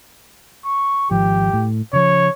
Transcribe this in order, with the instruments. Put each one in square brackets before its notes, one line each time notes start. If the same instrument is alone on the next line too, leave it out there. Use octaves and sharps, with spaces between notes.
[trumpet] C#6
[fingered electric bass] G#1 F3 [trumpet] G4
[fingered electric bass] A2
[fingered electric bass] C#3 F3 [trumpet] C#5